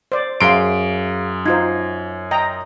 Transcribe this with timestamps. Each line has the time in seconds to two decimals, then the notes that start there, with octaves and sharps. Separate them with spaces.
0.12 C5 D5
0.41 F#2 G#4 E5 F5 C6 D7
1.46 D#4 F4 C5 G#6
2.31 D#5 G5 A#5